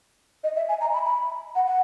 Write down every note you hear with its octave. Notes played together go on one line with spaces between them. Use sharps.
D#5
E5
G#5
A#5
B5
B5
F#5
F#5